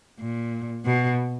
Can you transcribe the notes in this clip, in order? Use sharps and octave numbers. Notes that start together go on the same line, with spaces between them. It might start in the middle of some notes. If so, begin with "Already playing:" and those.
A#2
B2